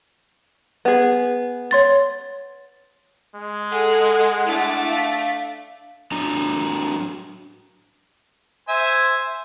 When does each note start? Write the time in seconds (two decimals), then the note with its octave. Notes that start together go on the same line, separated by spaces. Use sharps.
0.85 B3 G#4
1.71 C#5 C6 A6
3.35 G#3
3.72 G#4 A4 F#5
4.46 A3 D4 E4
4.88 F5
6.12 F#3 D4 A#5
8.69 C5 E5 G#5